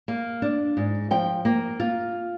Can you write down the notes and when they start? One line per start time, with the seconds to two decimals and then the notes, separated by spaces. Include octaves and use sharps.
0.08 A#3
0.42 D4
0.77 G#2
1.11 F3 G5
1.45 A#3
1.80 F4